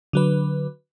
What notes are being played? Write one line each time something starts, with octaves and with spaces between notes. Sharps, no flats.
D3 F#3 B4